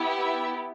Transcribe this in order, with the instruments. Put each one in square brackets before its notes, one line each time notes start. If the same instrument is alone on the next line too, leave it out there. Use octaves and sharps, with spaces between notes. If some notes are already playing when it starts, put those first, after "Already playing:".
Already playing: [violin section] B3 E4 G4
E5